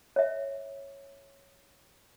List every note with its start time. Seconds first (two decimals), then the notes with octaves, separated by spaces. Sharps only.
0.16 C#5 E5